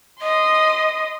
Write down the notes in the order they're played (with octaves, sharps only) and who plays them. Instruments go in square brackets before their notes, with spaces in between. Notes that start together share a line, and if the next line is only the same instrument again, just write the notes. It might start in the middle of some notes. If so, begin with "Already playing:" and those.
[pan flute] D#5 [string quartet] C6 D#6